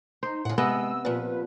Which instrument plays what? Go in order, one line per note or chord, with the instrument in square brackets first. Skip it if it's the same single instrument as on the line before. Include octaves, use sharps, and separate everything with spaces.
[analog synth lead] D#4 [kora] C5
[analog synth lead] A2 [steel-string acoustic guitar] C#3 F#5
[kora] C3 B3 D#5 [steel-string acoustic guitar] G#3 [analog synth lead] E6
[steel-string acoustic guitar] A#2 F3 [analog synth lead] B4